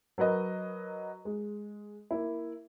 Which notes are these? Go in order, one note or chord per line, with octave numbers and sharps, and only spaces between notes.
F#3 A#4 B4 D#5
G#3
A#3 E4